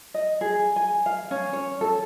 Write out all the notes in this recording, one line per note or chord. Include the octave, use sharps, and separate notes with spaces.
D#5
G#4
G#5
F5
C#4
C#5
A4